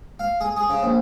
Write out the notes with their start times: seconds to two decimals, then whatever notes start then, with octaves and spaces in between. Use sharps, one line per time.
0.20 F5
0.41 G#4
0.57 G#4
0.70 C#3
0.83 A#1